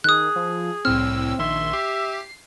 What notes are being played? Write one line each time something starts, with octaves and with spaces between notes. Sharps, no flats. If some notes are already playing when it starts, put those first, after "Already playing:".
D#3 G#4 D#6 F#6
F3
C2 A2 C4 E6 F6
A#1 D#3 E5 C6
G4 C7